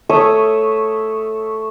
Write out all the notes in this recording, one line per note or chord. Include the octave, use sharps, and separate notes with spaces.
A3 C#5 E5 D#6